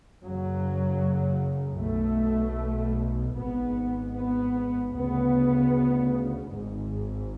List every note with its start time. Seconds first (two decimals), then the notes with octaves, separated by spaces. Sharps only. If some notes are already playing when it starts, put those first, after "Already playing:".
0.22 F#1 F#2 C#3 F#3
1.79 B1 B2 A3
3.36 G#1 G#2 B3
4.15 B3
4.94 D2 C#3 B3
6.52 G#1 G#2